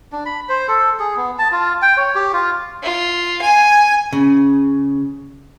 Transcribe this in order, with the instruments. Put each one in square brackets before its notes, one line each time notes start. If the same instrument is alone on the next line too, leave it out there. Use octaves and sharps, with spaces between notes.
[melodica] D4
B5
C5
A4
G#4
B3
A5
F4
G5
C#5
G4
F4
[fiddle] F4
G#5
[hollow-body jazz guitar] C#3